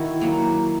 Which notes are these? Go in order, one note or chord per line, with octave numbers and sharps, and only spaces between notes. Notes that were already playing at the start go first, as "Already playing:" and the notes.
Already playing: D#3 E4 F#4
F#3 A#3